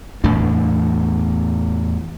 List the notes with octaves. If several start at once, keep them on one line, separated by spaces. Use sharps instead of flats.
E2 A2 E3 D4